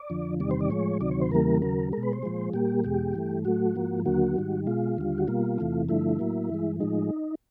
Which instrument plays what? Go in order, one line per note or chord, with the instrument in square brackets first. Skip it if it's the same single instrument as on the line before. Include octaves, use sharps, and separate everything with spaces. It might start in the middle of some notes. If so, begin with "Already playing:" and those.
Already playing: [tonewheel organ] D5
F2 D3 F3
E2 C3 D#3 G3 D5
C5
D5
A2 F3 G#3 C#5
D2 C3 D#3 F#3 D5
C#5
C5
E2 C#3 E3 G3 A#3 A#4
D#2 C#3 F#3 A#4
G#3 A#4
B2
B4
C5
A#2 F3 G#3
A#2 G3 A#3 G4
E2 B2 G#3 G4
G2 E3 A3
A2 F#3 A3 F#4
G#2 F3 A#3
D#2 D3 F#3 A#3 F#4
G#2 D#3 G3
B2 G#3 F4
D#2 D3 G3
F#4
B2 G3 A#3 F4
E2 C3 E3 A3
G2 D3 F3 A3 E4
A2 F#3 A#3
G2 E3 G#3
A2 F3 G#3 D#4